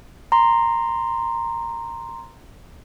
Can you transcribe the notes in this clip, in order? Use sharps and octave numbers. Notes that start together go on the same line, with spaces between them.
A#5 C6